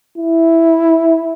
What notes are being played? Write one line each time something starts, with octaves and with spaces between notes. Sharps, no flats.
E4